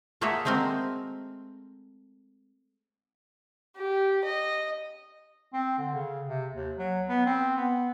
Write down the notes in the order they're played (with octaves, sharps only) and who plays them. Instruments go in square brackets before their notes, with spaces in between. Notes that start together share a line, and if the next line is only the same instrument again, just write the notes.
[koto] A3 A#3 F#4 G#4 C#5 E5
G#3 A3 C4 F#4 A#4
[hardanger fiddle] G4
D#5
[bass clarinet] C4
D3
C#3
C3
D#2
F#3
B3
C4
B3